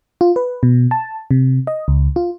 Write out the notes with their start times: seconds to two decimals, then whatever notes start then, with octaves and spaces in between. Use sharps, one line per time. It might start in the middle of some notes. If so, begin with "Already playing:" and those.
0.21 F4
0.36 B4
0.63 B2
0.91 A5
1.31 C3
1.67 D#5
1.88 C#2
2.16 F4